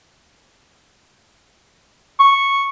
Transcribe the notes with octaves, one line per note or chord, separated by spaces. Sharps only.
C#6